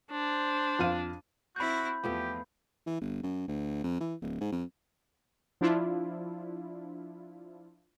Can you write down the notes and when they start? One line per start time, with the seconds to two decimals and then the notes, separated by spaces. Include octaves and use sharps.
0.12 D4 C5
0.79 F2 F5 D#7
1.56 C4 E4 F#4 B5 G6
2.04 E2 F3 A3 B3 G4
2.87 E3
3.01 G1
3.23 F#2
3.48 D2
3.84 F2
4.01 E3
4.21 D1
4.40 G#2
4.52 F2
5.61 F3 D4 E4 F4